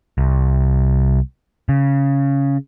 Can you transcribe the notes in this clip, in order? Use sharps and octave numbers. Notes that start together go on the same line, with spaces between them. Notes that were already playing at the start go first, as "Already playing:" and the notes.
C2
C#3